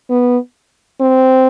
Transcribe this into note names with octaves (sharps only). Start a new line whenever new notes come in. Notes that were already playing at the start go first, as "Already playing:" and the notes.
B3
C4